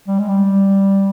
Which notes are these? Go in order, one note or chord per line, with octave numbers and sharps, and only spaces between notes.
G3
G#3
G3